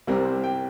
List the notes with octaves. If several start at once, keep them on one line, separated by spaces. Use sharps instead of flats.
C2 C3 G3 C4 A#4
C5
G5